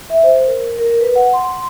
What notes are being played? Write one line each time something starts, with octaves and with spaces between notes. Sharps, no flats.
E5
C5
A#4
A#4
B4
F#5
C6